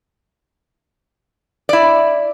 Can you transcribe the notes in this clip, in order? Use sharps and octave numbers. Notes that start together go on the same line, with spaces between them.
E4 D5